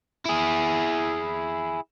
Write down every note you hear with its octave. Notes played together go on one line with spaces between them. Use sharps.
E4 G#4